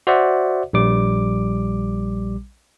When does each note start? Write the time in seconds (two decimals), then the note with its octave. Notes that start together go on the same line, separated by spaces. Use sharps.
0.07 F#4 C5 D5 E5 F#5
0.73 A#1 G3 D6